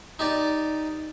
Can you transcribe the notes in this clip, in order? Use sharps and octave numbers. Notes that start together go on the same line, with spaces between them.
D#4 G4 D5